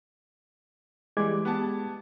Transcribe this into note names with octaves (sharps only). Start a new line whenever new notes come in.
E3 G3 G#3 D6 G#6
B3 G4 A5